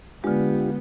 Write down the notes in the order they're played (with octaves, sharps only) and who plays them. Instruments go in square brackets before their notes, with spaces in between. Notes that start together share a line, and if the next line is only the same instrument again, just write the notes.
[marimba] D3 G#3 [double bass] B3 [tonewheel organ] D4 F4 G4